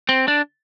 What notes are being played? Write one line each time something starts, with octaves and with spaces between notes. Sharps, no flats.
C4
D4